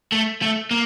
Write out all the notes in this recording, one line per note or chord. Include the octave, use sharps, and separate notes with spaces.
A3
A3
A#3